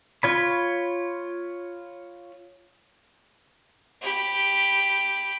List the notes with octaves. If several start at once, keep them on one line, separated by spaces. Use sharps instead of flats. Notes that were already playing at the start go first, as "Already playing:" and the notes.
F4 C#5 B5
G4 B5